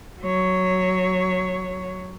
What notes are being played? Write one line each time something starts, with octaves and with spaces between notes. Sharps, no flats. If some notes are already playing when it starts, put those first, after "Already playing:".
F#3 C#5